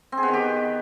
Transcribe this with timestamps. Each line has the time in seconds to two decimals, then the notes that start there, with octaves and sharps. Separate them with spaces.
0.12 C4
0.18 G#4
0.23 B3
0.28 D#3
0.33 G4